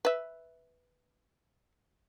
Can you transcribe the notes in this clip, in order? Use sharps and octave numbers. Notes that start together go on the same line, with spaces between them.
B4 E5